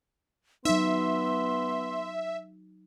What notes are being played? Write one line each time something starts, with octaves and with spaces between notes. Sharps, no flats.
F#3 B3 D#4 E5 C6